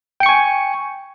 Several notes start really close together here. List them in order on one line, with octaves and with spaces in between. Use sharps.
G5 C#7 C#6 G#5